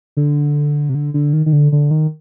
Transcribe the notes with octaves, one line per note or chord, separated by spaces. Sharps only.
D3
C3
D3
D3
D#3
D#3
D3
D3
D#3